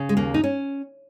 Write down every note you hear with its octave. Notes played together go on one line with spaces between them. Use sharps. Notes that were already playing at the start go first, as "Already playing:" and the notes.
Already playing: C#3
G#3
D#2 A#3
D#4
C#4